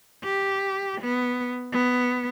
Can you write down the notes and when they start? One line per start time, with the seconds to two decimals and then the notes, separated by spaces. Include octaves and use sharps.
0.24 G4
1.02 B3
1.73 B3